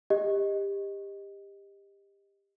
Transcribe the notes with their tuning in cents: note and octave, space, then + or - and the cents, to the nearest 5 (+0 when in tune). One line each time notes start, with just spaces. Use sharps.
G4 +20 D#5 +0